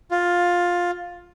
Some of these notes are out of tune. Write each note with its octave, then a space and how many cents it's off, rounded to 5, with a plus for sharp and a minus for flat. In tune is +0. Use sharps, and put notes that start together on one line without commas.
F4 +10